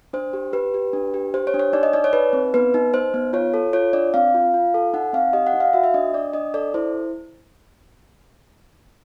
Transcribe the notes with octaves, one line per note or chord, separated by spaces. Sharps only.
D4 C5
G4
G4 B4
G4
D4
G4
G4 C5
C#5
D4
C#5
D#4 D5
D#5
D#4 D5
C#5
D#4 B4
C4
B3 B4
D#4
D#4 C5
B3
F4 C#5
A4
F4 C#5
D4 D5
C4 F5
F4
F4
A4
D#4 F#5
C4 F5
G4 D#5
F#5
D#4
F5
F#4 E5
E5
D4 D#5
D4 D5
D4 D#5
A4 D5
E4 C5